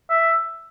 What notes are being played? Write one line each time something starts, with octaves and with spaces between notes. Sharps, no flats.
E5